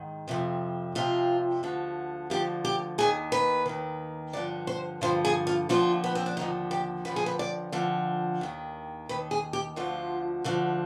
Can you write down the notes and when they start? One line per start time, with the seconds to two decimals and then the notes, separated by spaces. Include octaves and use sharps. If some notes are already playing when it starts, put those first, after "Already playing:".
Already playing: G#2 D#3
0.28 F2 C3 F3
0.95 F2 C3 F3 F4
1.63 D2 D3 F3
2.30 D2 D3 F3 G4
2.65 G4
2.98 D#2 D#3 G#4
3.32 B4
3.66 D#2 D#3
4.33 G2 D3 F3 D5
4.67 C5
5.01 G2 D3 F3 C5
5.25 G#4
5.47 F4
5.69 D#2 D3 F3 F4
6.04 B3
6.15 C4
6.26 D4
6.37 D#2 D3 F3 D#4
6.71 G4
7.05 F2 D3 F3 B4
7.16 G#4
7.26 B4
7.39 D5
7.72 F2 D3 F3
8.41 D#2 D#3
9.09 D#2 D#3 B4
9.31 G#4
9.53 G4
9.76 D2 D3 F3 F4
10.44 D2 D3 F3